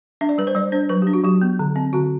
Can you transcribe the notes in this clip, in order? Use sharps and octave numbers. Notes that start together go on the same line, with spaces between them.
D4 E5
D5
G3 B4
C5
G3 D5
D4 C5
F#3 B4
D4 G4
F#4
F#3 G4
B3
D3
C4
D3 F#4